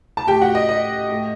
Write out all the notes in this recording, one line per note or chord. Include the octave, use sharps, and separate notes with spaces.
A5
A2 G4 G5
F#4 F#5
D#5
D#5
A2